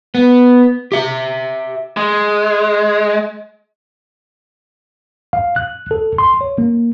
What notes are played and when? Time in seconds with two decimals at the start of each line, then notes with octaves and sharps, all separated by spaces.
0.15 B3
0.92 G4 E5
1.97 G#3
5.33 F5
5.56 F#6
5.91 A4
6.18 C6
6.41 C#5
6.58 A#3